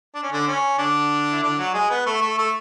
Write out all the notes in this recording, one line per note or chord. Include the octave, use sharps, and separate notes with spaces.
D4
C#4
D3 D4
C#4
D3 D4
E4
D3 D4
F#3 F#4
G#3 G#4
B3 B4
A3 A4
A3 A4
A3 A4